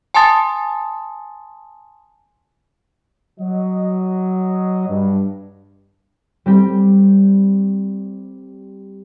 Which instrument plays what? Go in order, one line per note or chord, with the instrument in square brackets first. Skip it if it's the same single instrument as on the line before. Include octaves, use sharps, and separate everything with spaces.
[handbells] G#5 A5 C6 D#6 A6
[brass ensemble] F#3 D#5
G2
[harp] G3 C4 G4